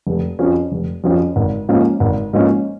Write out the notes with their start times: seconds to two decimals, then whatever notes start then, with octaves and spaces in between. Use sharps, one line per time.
0.07 F1
0.39 F2 F3 C#4
0.72 F1
1.04 F2 F3 C#4
1.36 G#1
1.69 G#2 F3 A#3 C#4
2.00 G#1
2.33 G#2 F3 A#3 C#4